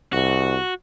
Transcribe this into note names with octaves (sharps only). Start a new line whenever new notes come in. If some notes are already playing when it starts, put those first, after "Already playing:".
C2 F#4